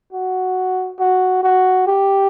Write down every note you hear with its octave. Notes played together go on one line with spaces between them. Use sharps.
F#4
F#4
F#4
G4